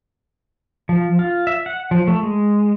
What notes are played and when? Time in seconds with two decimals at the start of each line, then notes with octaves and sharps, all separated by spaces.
0.89 F3
1.19 F4
1.47 E5
1.66 F#5
1.91 F3
2.08 A3
2.23 G#3